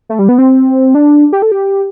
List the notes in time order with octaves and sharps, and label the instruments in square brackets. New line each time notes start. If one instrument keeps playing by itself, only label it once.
[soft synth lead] A3
G3
B3
C4
D4
G4
A4
G4